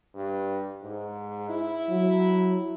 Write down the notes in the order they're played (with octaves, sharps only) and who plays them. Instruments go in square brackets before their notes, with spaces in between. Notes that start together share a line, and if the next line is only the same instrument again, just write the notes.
[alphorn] G2
G#2
E4
[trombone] F#3